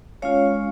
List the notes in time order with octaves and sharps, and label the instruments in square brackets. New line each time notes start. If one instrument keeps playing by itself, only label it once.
[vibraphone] G#3 C#4 F4 C#5 F5